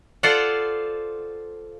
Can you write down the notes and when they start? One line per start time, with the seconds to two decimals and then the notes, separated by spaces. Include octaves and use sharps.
0.23 F4 A4 C5 D5 F5 F#5